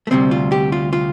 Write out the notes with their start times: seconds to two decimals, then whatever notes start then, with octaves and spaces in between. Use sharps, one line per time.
0.07 A3
0.11 D2 C3 G3 C4
0.31 F4
0.52 G4
0.72 F4
0.93 F4